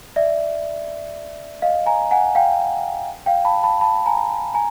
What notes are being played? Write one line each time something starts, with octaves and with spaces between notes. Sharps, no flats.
D5 E5
D#5 F5
G#5 A#5
F#5 G#5
F5 G5
F5 G5
A5 B5
A5 B5
A5 B5
G#5 A#5
G#5 A#5